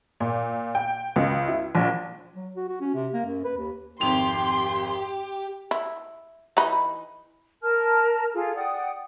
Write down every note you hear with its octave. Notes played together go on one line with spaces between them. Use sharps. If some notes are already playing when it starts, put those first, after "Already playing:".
A#2
G5
C#2
E4
A#1
F#3
F#4
F#4
C#4
C3
A#3
F#2
B4
D#2
G#1 F2 G4 C6 F7
E4
E3 D#4 B5
A#4 A5 F6
F4 G#4 A4
D5 F#5 G5 D#6